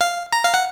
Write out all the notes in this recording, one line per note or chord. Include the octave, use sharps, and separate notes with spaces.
F5
A#5
F5
F#5